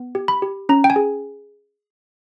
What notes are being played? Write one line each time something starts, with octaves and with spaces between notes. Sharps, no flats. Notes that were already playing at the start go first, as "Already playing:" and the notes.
Already playing: B3
G4
B5
G4
C#4 A#5
G5
G#5
G#4